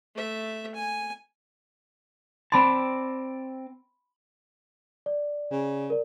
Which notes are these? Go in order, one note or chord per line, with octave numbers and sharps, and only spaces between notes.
A3 E5
G#5
C4 D5 A5 B5 C6
D5
C#3
A#4 D5